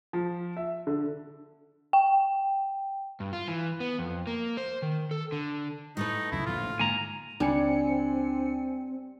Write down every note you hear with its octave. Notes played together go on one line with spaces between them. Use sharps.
F3
E5
D3
G5
G2
F4
E3
B3
F2
A#3
C5
D#3
A4
D3
A2 A3 D#4 B4
C#2 F#2 E4
A#1 A#2 D3 F4
G#2 D3 A#3 G#5 A#5
C#2 G3 C4 D4 G#5 C#7